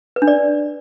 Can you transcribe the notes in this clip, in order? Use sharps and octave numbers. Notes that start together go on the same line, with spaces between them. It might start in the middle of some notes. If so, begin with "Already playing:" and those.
B4
D4
D5